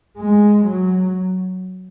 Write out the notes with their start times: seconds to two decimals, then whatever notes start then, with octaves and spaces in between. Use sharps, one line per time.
0.18 G#3
0.65 F#3